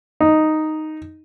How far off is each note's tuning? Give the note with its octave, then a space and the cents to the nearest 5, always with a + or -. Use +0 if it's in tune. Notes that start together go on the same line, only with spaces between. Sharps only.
D#4 +0